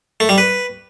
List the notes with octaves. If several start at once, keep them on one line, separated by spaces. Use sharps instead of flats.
A3
G3
B4